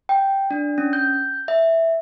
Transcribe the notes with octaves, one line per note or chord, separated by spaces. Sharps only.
G5
D4
C#4
G6
E5